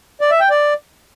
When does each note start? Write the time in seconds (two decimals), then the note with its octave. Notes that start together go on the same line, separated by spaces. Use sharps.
0.21 D5
0.31 E5
0.40 G5
0.50 D5